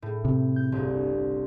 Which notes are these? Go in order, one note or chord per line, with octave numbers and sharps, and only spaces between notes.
A2
C3
G6
G1 C2